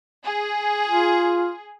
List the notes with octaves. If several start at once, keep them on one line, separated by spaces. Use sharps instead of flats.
G#4
F4